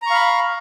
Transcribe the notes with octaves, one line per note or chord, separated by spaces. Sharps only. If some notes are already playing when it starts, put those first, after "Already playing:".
F5 A#5 B5 C#6